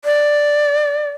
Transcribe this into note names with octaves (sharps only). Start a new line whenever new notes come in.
D5